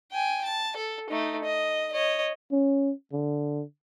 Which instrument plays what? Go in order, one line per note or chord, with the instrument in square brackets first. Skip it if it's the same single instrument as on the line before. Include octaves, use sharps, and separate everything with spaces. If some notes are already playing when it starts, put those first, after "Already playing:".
[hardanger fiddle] G5 G#5
A5
A4
A3 D#4
D#5
C#5 D#5
[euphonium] C#4
D3